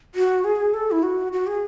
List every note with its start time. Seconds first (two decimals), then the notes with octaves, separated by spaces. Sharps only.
0.15 F#4
0.44 G#4
0.74 A4
0.91 E4
1.03 F#4
1.32 F#4
1.47 G#4